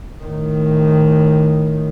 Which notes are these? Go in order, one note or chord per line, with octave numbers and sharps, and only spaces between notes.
A2 D#3